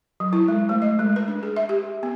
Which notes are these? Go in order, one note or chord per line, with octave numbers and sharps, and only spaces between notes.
F#3
E4
G#3
A3
D#5
G#3
B4
D4
G#4
E5
G4
B3